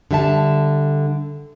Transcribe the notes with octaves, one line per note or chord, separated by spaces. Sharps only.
D3 G3 E5 A5